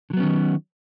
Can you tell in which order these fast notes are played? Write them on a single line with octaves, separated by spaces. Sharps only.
D3 F#3 B3 C#4 D#3